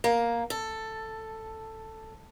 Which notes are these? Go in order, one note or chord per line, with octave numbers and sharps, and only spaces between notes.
A#3
A4